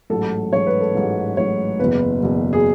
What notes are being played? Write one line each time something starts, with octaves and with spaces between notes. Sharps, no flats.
A1 G#2 F#3 A4
A1 G#2 F#3 C#5
B4
A4
A1 G#2 F#3
A1 G#2 F#3 C#5
F#1 E2 B2 B4
F#1 E2 B2
G#4